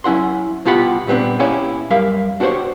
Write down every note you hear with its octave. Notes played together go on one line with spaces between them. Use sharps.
F#3 C#4 E4 F#5 C6
C2 B2 F4 G4 F#5 B5
A#2 G3 B3 C4 D4
A#3 C#4 E4 G4 C#5 G#5
F#2 G3 A#4 E5 F5
D4 F#4 G4 A#4 C5 C#5